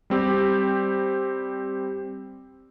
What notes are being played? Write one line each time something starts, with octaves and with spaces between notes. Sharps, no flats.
G3 C4 G4